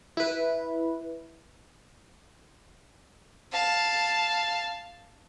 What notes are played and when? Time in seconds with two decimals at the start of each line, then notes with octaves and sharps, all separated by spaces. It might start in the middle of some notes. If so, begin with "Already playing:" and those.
0.17 E4 B4
3.52 F5 A5